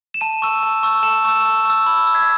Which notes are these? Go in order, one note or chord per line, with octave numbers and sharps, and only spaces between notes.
E7
A5 D#7
C#6 E6
A5
C#6 E6
A5 E7
C#6 E6
A5
C#6 E6
B5
E6
G#6